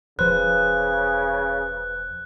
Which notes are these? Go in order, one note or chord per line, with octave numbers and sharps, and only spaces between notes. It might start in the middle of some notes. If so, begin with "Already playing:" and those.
E1 C#3 F3 B4 C5 F#6